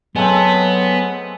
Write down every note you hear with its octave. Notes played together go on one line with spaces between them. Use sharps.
F#3 G#3 A3 B3 C4